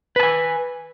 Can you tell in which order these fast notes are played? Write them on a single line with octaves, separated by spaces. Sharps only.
B4 A5 G#5